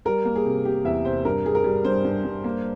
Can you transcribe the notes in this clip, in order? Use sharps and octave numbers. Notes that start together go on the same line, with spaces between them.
G3 A#4
A#3
G#4
C3
C3 G4
E2 E5
C3 C5
G2 A#4
G3 G#4
A#4
G3
G2 C5
G2
G2
A#3